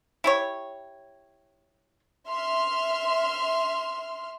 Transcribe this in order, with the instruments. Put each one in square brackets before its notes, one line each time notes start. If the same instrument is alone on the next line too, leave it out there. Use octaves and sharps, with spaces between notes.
[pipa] E4 G4 C#5
[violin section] E5 C6 F6